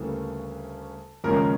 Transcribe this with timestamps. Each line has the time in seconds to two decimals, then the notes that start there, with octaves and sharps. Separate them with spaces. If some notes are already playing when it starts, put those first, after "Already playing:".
Already playing: D2 C#3 E3 G3 A#3 A4
1.24 D#2 C#3 F3 G#3 C#4 A#4
1.37 A#4